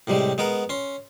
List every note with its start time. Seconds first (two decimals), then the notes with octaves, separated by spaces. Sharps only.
0.07 A2 C3 G3 G#3
0.38 G#3 B3 A#4 F#5
0.69 C#4 C6